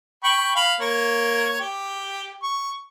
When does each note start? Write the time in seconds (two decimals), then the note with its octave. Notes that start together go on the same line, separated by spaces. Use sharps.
0.24 G5 B5 C#6
0.56 F5 B5
0.80 A#3 C#5
1.60 G4
2.43 C#6